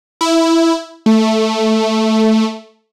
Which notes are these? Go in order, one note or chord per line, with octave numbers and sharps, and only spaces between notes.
E4
A3